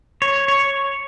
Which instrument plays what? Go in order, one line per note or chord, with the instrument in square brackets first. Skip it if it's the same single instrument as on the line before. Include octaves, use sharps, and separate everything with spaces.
[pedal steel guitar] C#5
C#5